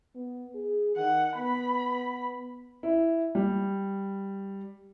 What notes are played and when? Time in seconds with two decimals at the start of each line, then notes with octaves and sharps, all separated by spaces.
0.15 B3
0.55 G#4
0.96 D#3 F#5
1.37 B3 B5
2.83 E4
3.35 G3